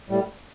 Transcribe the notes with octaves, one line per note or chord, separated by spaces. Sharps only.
A2 G3